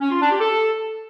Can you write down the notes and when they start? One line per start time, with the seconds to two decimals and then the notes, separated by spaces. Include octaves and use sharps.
0.01 C#4
0.11 F4
0.21 D4
0.31 G4
0.41 A4